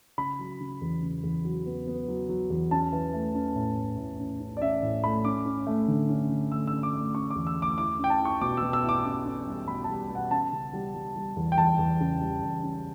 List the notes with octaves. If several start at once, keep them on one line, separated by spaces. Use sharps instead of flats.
C#3 B5
F#3
C#3
E2
C#3
E2
F#3
B3
B3
F#3
F#3
E2
C#4 A5
E3
A3
C#4
A2
A3
A2
C#4
C#4
D5
C#4 E5
A2
A3 B5
C#4 D6
C#4
A3
D3
C#4
D3
A3 E6
C#4 E6
D6
A3
C#4 C#6
D6
E2
E6
A3
D6
E4 D6
C#4 G5
A5
E4
C#6
B2 D6
E6
B2
E6
E4 D6
C#4 D6
C#4
G3
B2 B5
G3 A5
B2 F#5
C#4 A5
C#3
G3
G3
G3
E2
G5
E2 A5
E2
C#3
G3
E2
C#4